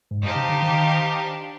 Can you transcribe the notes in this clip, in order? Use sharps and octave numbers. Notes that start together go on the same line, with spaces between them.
G#2
G2 D#4 G4 C5 F5 A5
C#3
D3
D#3
D4